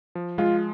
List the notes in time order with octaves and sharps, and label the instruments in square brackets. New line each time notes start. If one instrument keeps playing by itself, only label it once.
[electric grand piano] F3
[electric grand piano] G#3 [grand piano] F4